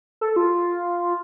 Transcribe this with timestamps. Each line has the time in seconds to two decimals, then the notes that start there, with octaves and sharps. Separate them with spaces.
0.21 A4
0.36 F4